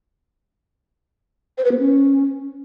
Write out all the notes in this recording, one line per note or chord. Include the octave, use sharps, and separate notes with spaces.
C5
B4
B3
C#4